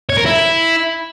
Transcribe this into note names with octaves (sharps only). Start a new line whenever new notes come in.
C#5
A#4
E4